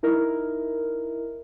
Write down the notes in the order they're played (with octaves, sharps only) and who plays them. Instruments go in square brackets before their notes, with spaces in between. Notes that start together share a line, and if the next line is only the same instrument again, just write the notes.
[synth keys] D#4 E4 A#4